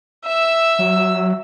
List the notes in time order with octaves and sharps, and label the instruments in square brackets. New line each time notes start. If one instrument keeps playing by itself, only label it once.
[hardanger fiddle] E5 [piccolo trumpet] E6
[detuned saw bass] F#3